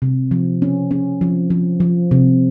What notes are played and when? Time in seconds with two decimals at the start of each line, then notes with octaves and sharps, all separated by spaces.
0.02 C3
0.31 F3
0.62 C#4
0.91 C#4
1.21 F3
1.50 F3
1.80 F3
2.11 C3